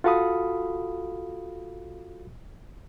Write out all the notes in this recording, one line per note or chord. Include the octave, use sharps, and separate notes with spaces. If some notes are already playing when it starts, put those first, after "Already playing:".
F4 F#4 A4 F5 B5 D#6